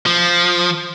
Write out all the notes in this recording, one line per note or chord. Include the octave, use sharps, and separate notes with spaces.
F3